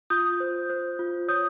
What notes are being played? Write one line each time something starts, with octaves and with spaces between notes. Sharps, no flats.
F4 D#6 G6
C5
C5
F4
C#5 D#6 G6